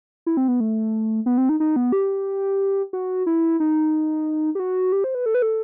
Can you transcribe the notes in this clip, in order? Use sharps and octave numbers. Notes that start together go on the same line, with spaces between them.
E4
C4
B3
A3
B3
C4
D#4
D#4
B3
G4
F#4
E4
D#4
G4
F#4
G4
C5
B4
A4
B4
A4